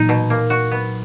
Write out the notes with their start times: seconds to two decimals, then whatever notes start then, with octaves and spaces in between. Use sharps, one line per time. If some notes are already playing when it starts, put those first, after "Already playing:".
Already playing: A#2 E3 F#3 D#4
0.09 B2
0.30 A#3
0.50 F#4
0.72 B3